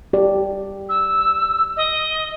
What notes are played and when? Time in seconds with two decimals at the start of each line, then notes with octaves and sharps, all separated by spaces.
0.13 G4 D5
0.89 E6
1.77 D#5